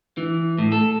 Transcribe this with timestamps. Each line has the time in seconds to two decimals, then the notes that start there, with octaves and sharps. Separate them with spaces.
0.17 E3
0.58 A2
0.72 A4